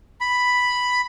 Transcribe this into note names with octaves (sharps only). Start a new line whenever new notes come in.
B5